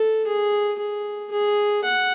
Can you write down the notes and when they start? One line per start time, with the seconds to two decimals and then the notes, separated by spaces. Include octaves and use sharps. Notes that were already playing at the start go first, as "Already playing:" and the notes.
Already playing: A4
0.26 G#4
0.78 G#4
1.31 G#4
1.84 F#5